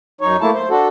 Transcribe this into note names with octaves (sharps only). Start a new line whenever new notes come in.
F#2 D#4 C#5
A3 A#3 E4 A5
C5
D4 F#4 A4